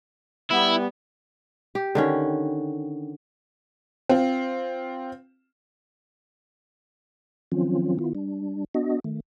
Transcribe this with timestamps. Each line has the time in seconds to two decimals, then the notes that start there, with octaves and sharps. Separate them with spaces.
0.51 G3 B3 E4
1.75 G4
1.95 D3 D#3 C#4
4.09 C4 F4
7.52 D#3 F3 F#3 C4 C#4 F4
7.99 D#3 B3 E4 F4
8.15 G3 D4
8.75 B3 D4 F#4 D#5
9.04 D#3 A3